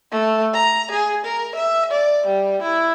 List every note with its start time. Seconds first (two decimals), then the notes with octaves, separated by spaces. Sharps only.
0.12 A3
0.54 A#5
0.91 G#4
1.25 A#4
1.55 E5
1.91 D5
2.26 G3
2.62 E4